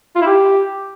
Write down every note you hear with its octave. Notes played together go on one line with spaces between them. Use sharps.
F4
E4
G4